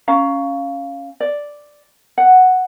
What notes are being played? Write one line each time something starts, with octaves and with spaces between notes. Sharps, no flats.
C#4 F5 A#5
D5
F#5